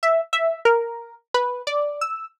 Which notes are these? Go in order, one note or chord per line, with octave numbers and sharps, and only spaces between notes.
E5
E5
A#4
B4
D5
E6